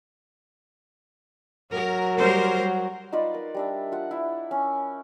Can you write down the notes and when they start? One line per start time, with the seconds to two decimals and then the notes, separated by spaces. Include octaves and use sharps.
1.74 F#3 A#4
2.18 G3 A#4 C5
3.13 D#4 F4 B4 D5
3.34 A#4
3.54 G3 D4 E5
3.92 F4 F#5
4.11 E4
4.51 C#4